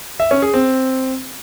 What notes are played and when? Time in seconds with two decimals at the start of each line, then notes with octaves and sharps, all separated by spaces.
0.20 E5
0.31 C#4
0.42 G#4
0.54 C4